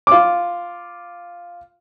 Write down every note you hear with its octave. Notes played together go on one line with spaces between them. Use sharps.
F4 D6